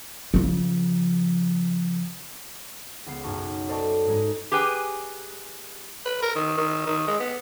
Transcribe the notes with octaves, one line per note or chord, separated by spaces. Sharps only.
C#3 F3
C#2 B3 C7
B1 F#2 D#4 F#4 A5 C#6
A4 C5 D5 D#5 A5 C#6
G#2 G#3 D#4
G4 G#4 B4 G5 G#5
B4
A#4
D#3
D#3
D#3
G#3
B3